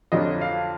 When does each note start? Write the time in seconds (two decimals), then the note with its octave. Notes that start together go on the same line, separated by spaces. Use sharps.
0.12 F2 D3 F#3 D4 F4 D#5
0.41 F5